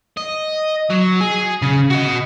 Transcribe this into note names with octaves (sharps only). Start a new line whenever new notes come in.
D#5
F#3
G#4
C#3
F#4 D#5